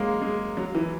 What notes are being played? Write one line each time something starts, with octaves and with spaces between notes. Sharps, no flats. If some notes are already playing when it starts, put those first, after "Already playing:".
Already playing: F#3 G#3 A#3
G#3
F#3
E3